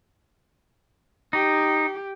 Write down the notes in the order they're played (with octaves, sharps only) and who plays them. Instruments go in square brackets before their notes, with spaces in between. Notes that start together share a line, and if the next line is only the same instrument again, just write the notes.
[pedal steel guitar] D#4 [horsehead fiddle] G4